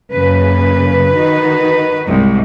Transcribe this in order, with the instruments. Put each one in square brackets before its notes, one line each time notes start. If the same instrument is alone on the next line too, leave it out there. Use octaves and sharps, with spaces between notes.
[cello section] F#2 C#3 A#3 [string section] B4
[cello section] D#3 D#4 F#4
[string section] C2 G#2